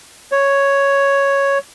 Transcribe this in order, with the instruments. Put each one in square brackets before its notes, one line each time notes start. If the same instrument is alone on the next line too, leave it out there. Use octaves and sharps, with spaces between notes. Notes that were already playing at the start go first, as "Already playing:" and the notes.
[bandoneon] C#5